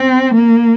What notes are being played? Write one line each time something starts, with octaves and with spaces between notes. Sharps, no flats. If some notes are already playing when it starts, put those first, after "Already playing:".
Already playing: C4
A#3